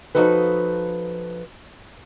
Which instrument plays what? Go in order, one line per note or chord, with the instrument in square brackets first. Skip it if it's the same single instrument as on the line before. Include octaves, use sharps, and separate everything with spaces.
[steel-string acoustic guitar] F3 A#3 D#4 F#4 A4 B4